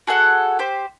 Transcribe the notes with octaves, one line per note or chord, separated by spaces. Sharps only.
F#4 G#4 A4 F#5
G4 C5